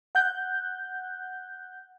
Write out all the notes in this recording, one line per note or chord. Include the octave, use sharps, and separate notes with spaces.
F#5 F#6 G6